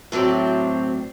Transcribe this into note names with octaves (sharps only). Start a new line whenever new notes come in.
A2 F#3 C4 D5